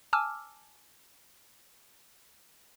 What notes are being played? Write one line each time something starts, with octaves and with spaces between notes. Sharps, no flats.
G#5 A5 D6 E6 F6